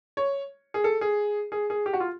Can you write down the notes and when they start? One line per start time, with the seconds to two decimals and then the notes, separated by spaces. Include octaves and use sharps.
0.17 C#5
0.74 G#4
0.84 A4
1.01 G#4
1.52 G#4
1.70 G#4
1.86 G4
1.93 F#4
2.00 F4